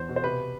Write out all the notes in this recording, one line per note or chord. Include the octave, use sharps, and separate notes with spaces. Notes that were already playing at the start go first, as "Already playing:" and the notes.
Already playing: E2 C5
B2
C5
C3 B4